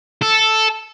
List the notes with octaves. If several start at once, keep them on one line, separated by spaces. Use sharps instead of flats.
A4